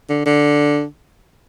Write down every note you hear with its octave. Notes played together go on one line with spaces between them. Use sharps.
D3
D3